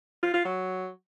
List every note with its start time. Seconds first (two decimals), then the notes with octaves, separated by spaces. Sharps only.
0.22 F4
0.34 F4
0.45 F#3